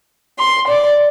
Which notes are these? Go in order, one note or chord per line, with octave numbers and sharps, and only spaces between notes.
C6
D5